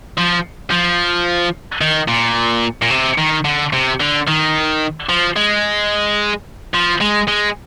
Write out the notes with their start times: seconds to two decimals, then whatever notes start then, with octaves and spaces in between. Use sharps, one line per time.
0.18 F3
0.71 F3
1.81 D#3
2.08 A#2
2.82 A#2
2.91 C3
3.18 D#3
3.45 D3
3.73 C3
4.00 D3
4.27 D#3
5.09 F3
5.36 G#3
6.74 F3
7.01 G#3
7.28 G#3